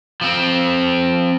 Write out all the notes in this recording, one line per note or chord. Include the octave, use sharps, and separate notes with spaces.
F3 C4